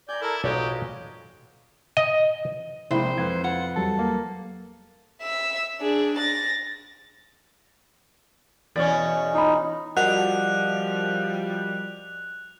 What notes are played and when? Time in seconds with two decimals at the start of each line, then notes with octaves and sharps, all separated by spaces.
0.09 D5 G#5 A#5 G6
0.22 E4 A4 A#4
0.44 B1 F3 F#3 G#3 G4 A4 D5 D#5
1.97 D#5
2.91 A#1 C3 G#3 E4 C5 E5 G5
3.18 F2 B4 G#6
3.44 F4 F#5
3.76 E2 F#3 G3 A4
3.99 A#3
5.22 E5 E6
5.81 D4 G#4
6.19 A6 A#6
8.76 E2 B2 C#4 D5
9.34 D#4 F4 B5
9.97 F3 G3 F#4 A#4 D#5 F#5 F#6 F7